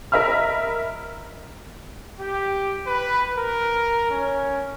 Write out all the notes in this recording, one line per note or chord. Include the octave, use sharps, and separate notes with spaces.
A#4 D#5 E5 B5 F6
G4
B4
A#4
C#4